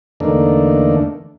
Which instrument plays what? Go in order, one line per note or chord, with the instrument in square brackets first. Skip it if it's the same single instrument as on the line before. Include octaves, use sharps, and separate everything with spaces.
[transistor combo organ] E2 D3 A3 A#3 D4 D#4